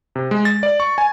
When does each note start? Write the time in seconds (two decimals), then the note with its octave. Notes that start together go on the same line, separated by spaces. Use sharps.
0.15 C3
0.31 G#3
0.45 A6
0.63 D5
0.80 C#6
0.98 G#5